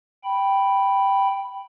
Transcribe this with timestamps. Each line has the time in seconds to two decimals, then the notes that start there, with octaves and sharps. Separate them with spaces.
0.24 G5 B5